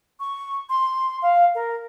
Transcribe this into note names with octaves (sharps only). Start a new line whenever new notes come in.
C#6
C6
F5
A#4